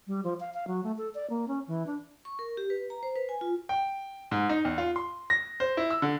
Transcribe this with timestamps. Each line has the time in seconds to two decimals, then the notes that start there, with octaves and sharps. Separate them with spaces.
0.07 G3
0.24 F3
0.40 F5
0.54 F5
0.67 F#3
0.84 A3
0.98 A4
1.15 D5
1.30 A#3
1.48 C#4
1.68 E3
1.87 D4
2.25 C#6
2.39 A#4
2.57 G4
2.70 B4
2.90 A#5
3.03 C5
3.15 B4
3.29 G#5
3.41 F4
3.69 G5
4.31 G#2
4.49 D#4
4.65 E2
4.78 F4
4.96 C6
5.30 A#6
5.60 C5
5.77 E4
5.90 E6
6.02 D3